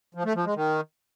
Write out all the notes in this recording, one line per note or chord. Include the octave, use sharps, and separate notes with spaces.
F3
A3
F3
G#3
D#3